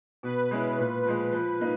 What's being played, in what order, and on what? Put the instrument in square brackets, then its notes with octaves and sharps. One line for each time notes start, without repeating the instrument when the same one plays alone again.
[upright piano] B2 [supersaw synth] B4
[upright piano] G#3 C#4 E4
A#2
F3 G#3
F3
A#3 D#4